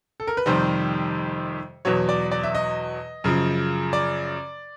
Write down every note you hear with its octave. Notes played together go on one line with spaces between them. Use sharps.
A4
A#4
B4
F2 C3 D#3 G3 C5
E2 B2 F#3 C#5
D5
D5
E5
D#5
F#2 C#3 F3
D5